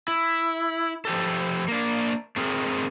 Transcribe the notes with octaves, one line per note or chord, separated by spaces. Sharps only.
E4
F3 G4 A4
A#3 D4
A3 C4 G#4 A#4